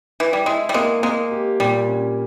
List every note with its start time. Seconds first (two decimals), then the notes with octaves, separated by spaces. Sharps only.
0.20 E3
0.33 G3
0.46 G#3 E4
0.69 G3
0.74 G#3 A#3
1.03 G#3 A#3
1.31 G4
1.60 A#2 G3
1.88 C#4